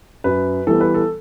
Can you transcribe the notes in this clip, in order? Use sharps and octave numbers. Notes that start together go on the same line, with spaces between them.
F#2 B4
E3 G3 B3 A4
B4
A4